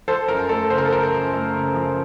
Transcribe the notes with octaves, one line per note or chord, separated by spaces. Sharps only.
F3 A4 C5
F#2 A#4
A3 A4
C#3 C5
A#4
A4
F3 A#4
F#2
A3
C#3
F3